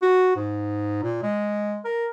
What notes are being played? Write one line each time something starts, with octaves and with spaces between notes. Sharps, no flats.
F#4
G#2
A#2
G#3
A#4